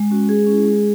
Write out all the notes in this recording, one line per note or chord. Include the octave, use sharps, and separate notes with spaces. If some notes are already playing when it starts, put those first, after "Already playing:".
Already playing: G#3
C#4 F#4
G#3 G#4
C#4 E4
G#3